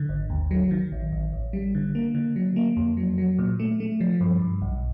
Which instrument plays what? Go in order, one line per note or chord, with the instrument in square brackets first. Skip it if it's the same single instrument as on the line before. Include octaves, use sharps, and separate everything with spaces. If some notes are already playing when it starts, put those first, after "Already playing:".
Already playing: [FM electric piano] D3
G#1
D#2
F#3
D#3
A1
A1
A1
G3
D3
A#3
D3
F#3
A#3
F2
F#3
F#3
A#2
A3
A3
F3
G2
G2
B1